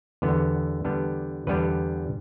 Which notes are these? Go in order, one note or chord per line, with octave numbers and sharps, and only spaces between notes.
E2 D3 G3 B3 D4
E2 D3 G3 B3 D4
E2 D3 G3 B3 D4 B4